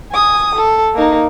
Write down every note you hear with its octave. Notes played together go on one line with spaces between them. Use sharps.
G#5 D#6
A4
A#3 D#4